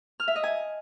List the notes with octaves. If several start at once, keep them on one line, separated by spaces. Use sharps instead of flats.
F6
E5
D#5
G#5